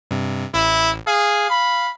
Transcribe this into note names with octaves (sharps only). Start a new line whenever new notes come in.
G2 C3
A1 E4
G#4 F5
B5